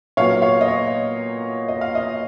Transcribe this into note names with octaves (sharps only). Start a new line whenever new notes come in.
A#2 F#3 B3 C#5 F5
C#5 F5
D#5
C#5
D#5
F5
D#5